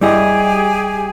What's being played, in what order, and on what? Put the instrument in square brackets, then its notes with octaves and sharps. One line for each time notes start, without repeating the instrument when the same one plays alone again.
[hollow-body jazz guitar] G3 E4 D#5 [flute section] G4 G#4 G#5